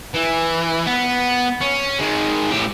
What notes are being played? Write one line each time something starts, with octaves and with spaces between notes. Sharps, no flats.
E3
B3
C#4
D#3 G#3
A2 G4